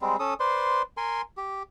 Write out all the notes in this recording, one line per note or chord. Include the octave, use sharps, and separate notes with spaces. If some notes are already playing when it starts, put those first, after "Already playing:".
G3 G#3 C4
C#4 A4 D#6
B4 C5 D5 C6
A#4 G#5 C6
G4